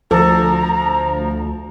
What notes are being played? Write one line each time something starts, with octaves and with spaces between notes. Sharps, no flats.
D2 F3 A4 A#5